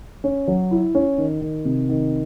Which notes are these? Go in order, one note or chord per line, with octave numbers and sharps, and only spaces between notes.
C#4
F#3
E4
C#4
D#3
D#3
C3
D#3